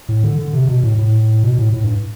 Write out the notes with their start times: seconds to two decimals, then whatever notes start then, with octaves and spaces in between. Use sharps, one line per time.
0.09 A2
0.24 D3
0.39 D3
0.53 C3
0.69 B2
0.83 A2
0.98 A2
1.44 B2
1.58 A2
1.74 A2
1.83 G2